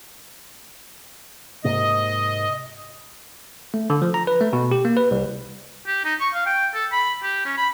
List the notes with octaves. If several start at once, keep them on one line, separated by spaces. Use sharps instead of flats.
G#2 C3 A#3 D#5
A3
D3
F3
A#5
B4
A3
B2
G4
A#3
B4
C2
G4
D#4
C#6
F5
G5
A4
B5
G4
C#4
B5